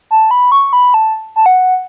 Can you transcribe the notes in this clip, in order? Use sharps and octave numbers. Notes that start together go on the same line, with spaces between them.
A5
B5
C#6
B5
A5
A5
F#5